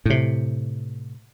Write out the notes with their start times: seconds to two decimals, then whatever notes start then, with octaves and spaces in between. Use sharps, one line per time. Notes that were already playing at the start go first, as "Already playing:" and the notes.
0.05 A2 C3